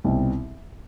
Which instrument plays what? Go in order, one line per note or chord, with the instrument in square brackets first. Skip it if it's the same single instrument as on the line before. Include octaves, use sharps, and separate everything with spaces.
[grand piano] C2 B2 G3 C4 D#4